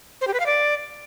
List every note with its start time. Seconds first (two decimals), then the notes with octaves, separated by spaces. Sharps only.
0.21 C5
0.27 G4
0.34 B4
0.40 F5
0.46 D5